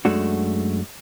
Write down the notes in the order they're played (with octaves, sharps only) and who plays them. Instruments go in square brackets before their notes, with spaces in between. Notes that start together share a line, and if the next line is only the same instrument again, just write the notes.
[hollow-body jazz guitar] F#2 G#3 A3 D4 F#4